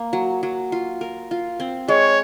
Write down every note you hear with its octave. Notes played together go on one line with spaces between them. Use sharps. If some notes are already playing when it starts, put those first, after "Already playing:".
Already playing: A#3
F#3
F#3
F4
A#4
F4
C4
G#3 C#5